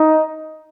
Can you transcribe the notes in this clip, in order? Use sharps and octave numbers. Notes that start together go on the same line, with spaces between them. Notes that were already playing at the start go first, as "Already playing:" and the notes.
Already playing: D#4